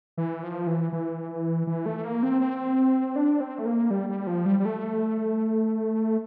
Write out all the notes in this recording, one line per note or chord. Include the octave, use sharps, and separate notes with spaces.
E3
F3
E3
E3
E3
A3
A#3
C4
C4
D4
C4
A3
A#3
G3
G3
F3
G3
G3
A3